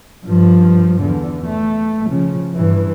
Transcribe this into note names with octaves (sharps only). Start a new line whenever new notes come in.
G2 F3
E2 D3
A3
C#3 F3
G2 E3